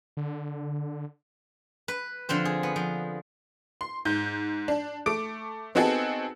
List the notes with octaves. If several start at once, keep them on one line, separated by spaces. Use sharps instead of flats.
D3
B4
D3 F3 C4 C5
G#4
B3
F3
C6
G#2 G6
D4
A3 D6 D7
B3 C4 D#4 F#4 G#4 A4